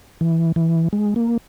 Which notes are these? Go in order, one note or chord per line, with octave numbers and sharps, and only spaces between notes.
E3
E3
G#3
A#3